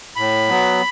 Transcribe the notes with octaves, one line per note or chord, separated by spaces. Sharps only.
A2 B5
F#3 B3